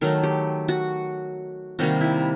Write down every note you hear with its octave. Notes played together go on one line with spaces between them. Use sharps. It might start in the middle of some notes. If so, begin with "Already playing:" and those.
D#3 F#3 A3 A#4
G4
F#4
C3 D#3 G3 A#3 F#4
E4